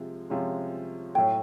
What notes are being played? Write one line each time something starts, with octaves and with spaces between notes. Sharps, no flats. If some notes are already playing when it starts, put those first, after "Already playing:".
Already playing: C3 F3 G#3
C3 F3 G#3 C#4
A2 F#3 A3 G5